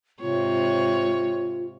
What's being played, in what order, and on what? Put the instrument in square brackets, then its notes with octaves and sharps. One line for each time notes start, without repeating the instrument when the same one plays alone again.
[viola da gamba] G#2 C3 C#5 [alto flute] F4